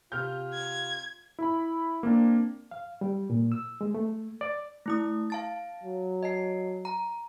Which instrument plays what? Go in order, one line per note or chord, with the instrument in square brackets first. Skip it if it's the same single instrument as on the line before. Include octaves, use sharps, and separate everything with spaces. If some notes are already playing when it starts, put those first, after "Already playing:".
[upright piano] C3 F6 G6 [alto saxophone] F4
[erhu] G#6
[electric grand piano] E4 B5
A#3 C4 D4
[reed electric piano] F5
G3
A#2
E6
G#3
A3
D5
[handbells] A3 E4 D#6
F5 A5 A6
[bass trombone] F#3
[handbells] D#5 A5 C7
A#5